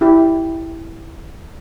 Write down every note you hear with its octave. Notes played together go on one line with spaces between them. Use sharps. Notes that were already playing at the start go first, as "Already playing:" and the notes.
E4 G4